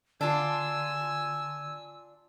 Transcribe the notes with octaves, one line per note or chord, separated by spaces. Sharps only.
D3 D4 F4 G#5 E6